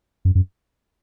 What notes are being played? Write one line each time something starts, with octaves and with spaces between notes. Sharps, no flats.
F#2
F#2